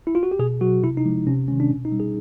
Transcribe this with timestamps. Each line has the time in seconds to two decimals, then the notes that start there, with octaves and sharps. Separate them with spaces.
0.07 E4
0.15 F4
0.23 F#4
0.31 G4
0.39 B2 G#4
0.61 F#3 F#4
0.83 C3 E4
0.97 D#4
1.06 F3 G#3
1.27 C3 C#4
1.48 D#3 G#3 C#4
1.60 D4
1.70 B2 C#4
1.85 D#4
1.92 G3
2.00 G#4